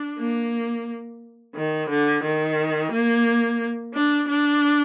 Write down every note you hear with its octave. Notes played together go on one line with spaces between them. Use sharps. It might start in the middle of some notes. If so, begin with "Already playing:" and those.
Already playing: D4
A#3
D#3
D3
D#3
A#3
D4
D4